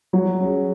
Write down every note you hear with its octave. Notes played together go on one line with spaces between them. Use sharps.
F#3
C#4 G#4